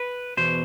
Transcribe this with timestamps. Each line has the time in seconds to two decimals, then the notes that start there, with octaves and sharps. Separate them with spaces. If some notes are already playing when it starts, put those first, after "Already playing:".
Already playing: B4
0.37 E2 B2 C5